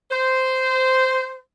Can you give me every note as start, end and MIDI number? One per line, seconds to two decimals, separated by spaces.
0.11 1.37 72